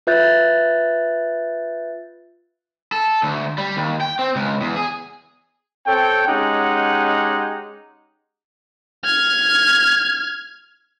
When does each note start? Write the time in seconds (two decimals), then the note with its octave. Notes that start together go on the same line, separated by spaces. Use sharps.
0.07 F4 B4 E5 F#6 G6 A6
2.92 A4
3.23 D2
3.58 G3
3.77 D#2
4.01 G5
4.19 C4
4.36 C#2
4.61 E2
4.76 G#4
5.87 C4 A4 C#5 G5
6.28 G#3 C#4 D#4 G4 F#5
9.05 F6 G#6